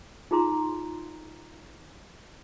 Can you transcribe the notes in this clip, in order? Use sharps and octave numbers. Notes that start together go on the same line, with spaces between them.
D#4 F4 G#4 A#5 C6